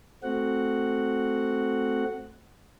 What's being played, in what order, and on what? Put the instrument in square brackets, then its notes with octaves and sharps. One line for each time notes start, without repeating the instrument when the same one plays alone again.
[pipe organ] A3 C4 F#4 F#5